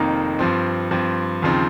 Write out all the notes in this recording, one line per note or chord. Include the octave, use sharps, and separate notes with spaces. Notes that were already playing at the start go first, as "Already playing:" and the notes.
Already playing: F1 F2 D#3 A#3 D#4
G2 F3 C4
G2 F3 C4
D#2 C#3 F3 C4 D#4